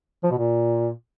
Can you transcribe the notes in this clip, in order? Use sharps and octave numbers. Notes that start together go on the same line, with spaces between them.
F3
B2
A#2